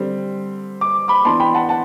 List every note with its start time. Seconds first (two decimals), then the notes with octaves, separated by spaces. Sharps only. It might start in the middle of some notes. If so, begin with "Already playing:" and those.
Already playing: D3 G3 C4
0.81 D6
1.08 B5 D6
1.25 E3 B3 D4 A5 C6
1.40 G5 B5
1.55 F#5 A5
1.69 F#5 A5